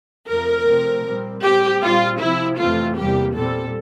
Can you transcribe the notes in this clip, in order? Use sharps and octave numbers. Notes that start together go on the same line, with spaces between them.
F2 C3 F3 A3 A#4
C3 F3 A3 C4
A#2 G3 C4
A2 G3 C4 G4
A#2 G3 C4 F4
C3 F3 C4 E4
F2 C3 E3 A3 C4 F4
E2 C3 G3 A#3 G4
A#2 G3 C4 A4